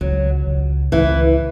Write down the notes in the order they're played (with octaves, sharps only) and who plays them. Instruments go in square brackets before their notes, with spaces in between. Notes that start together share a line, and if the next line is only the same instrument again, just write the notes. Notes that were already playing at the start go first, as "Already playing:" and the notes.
[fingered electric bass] C#2 [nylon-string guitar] F#3
[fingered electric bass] C#2
[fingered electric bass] C#2 [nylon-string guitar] E3